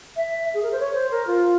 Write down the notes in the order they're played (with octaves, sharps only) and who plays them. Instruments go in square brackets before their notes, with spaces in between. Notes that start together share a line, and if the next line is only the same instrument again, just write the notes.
[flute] E5
G#4
A#4
C5
C#5
C5
A#4
F4